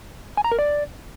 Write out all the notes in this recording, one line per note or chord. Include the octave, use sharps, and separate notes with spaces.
G#5
A#5
A#4
D5